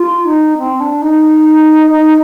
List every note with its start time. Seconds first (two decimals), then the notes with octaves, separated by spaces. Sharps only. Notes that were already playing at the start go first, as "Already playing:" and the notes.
Already playing: F4
0.25 D#4
0.58 C4
0.80 D4
1.02 D#4
1.90 D#4